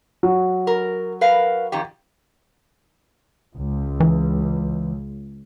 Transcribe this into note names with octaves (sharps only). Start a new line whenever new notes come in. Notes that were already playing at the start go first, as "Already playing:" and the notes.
F#3
A#4
A#4 B4 F5
F2 D#3 G4
C#2
E3